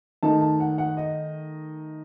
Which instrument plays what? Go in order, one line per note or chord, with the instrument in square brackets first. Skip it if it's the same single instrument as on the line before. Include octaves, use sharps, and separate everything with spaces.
[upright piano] D#3 A3 D#4 A5
A5
F#5
F#5
D#5